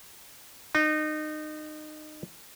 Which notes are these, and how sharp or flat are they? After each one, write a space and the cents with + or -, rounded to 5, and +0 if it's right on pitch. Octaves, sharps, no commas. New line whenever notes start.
D#4 -25